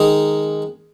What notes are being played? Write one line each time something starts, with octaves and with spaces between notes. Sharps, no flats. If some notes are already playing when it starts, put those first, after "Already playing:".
Already playing: D#3 G#3 D#4 D#5